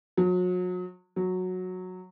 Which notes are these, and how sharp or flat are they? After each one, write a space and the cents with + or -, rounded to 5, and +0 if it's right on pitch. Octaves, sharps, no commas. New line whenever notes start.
F#3 -35
F#3 -10